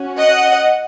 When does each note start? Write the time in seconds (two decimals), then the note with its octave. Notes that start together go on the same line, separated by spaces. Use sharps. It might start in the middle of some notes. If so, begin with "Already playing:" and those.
Already playing: C#4 F#4
0.17 D#5 F#5